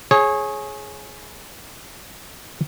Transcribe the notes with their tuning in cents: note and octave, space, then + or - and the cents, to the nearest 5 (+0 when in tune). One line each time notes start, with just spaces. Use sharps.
G#4 +15 C#5 -20